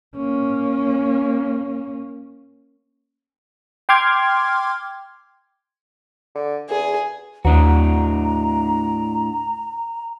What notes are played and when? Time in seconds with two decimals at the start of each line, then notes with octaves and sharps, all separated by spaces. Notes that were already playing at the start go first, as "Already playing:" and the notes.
0.16 A#3 C#4
3.89 G5 C6 D6 F6 G#6
6.35 D3
6.70 E2 G#4
7.45 D#2 A2 D4 F#4 A#5